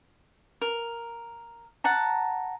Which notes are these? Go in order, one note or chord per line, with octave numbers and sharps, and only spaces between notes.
A#4
F#5 A5 A#5